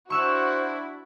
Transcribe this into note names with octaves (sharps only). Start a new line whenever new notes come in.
D4 E4 F#4 C5 C#6 E6 F#6